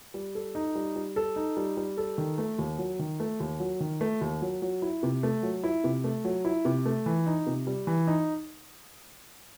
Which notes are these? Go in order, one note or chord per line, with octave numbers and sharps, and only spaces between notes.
G3
A4
D#4
G3
G3
A4
D#4
G3
G3
A4
D#3
A3
D#2
F#3
D#3
A3
D#2
F#3
D#3
A3
D#2
F#3
F#3
E4
C3
A3
F#3
E4
C3
A3
F#3
E4
C3
A3
E3
D#4
C3
G3
E3
D#4